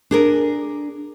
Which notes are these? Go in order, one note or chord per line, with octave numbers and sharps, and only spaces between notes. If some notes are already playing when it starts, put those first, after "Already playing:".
D4 G#4 A#4